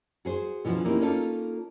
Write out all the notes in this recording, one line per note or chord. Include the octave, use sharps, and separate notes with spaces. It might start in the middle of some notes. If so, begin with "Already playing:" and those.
F#4 G#4 C5
B2 E3 F3 C#4 F#4
A#3 C4 C#4 D#4 E4 G4
A#3 C#4 D#4 F4 A4